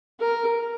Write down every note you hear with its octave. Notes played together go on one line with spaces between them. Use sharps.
A#4